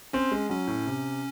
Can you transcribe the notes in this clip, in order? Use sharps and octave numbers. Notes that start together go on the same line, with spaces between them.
C4 C#4
G#3
F#3 C#4
A2
C3